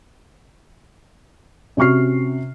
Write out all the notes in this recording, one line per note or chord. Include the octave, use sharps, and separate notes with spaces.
C3 C#4 F#4 C#6 F6 C7